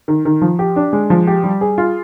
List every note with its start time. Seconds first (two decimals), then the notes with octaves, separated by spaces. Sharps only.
0.08 D#3
0.25 D#3
0.41 F3
0.59 G4
0.76 D4
0.93 G#3
1.10 F3
1.27 G4
1.44 G3
1.61 G#4
1.78 F4